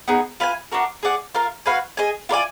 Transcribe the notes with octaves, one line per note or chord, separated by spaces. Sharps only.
B3 D#4 G#4
F4 B4 F5 G#5
D4 F#4 A#4
G#4 D5 F#5
F4 A#4 F5
F#4 B4 F5 G#5
G#4 D#5 G#5
F4 A#4 D5 G#5